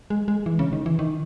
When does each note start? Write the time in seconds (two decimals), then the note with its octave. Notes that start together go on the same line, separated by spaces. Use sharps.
0.10 G#3
0.28 G#3
0.46 E3
0.59 C#3
0.73 D#3
0.86 E3
0.99 D#3